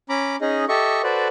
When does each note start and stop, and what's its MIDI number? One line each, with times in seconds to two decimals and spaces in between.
0.09 0.36 61
0.09 0.36 82
0.09 0.36 83
0.09 0.36 86
0.41 0.65 61
0.41 0.65 63
0.41 0.65 68
0.41 0.65 75
0.68 1.02 67
0.68 1.02 69
0.68 1.02 75
0.68 1.02 76
0.68 1.02 85
1.04 1.28 66
1.04 1.28 69
1.04 1.28 71
1.04 1.28 72
1.04 1.28 74